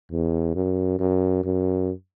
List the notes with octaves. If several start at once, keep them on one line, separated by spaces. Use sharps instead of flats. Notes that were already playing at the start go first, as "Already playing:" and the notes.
E2
F#2
F#2
F#2